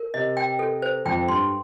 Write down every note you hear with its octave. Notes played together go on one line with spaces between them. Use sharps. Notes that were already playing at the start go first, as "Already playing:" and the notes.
Already playing: A#4
C3 D#5
G5
A4
C5
F2 G5
G2 C6